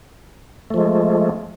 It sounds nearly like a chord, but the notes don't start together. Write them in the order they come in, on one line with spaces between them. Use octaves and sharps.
A3 F3 G#3